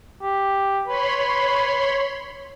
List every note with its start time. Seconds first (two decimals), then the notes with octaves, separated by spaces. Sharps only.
0.22 G4
0.87 B4 C#5 B5 C6